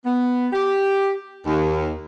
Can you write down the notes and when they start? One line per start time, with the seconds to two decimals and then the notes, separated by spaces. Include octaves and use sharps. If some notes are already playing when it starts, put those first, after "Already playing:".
0.04 B3
0.53 G4
1.46 D#2